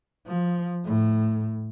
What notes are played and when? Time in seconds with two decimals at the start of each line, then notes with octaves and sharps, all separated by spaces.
0.27 F3
0.85 A2